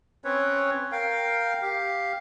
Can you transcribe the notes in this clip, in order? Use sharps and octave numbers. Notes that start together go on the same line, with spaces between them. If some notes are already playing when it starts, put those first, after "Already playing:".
C4 C#4 B4 C#5
A#4 F5 G5
G4 F5